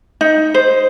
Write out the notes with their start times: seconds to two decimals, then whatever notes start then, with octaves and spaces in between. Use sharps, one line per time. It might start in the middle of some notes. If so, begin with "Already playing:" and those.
0.21 D#4
0.54 C5